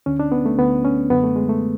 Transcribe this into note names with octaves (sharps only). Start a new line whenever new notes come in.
D2 D3 C#4
D4
B3
A3
D2 D3 B3
C#4
F#2 D3 B3
A3
G#3
A3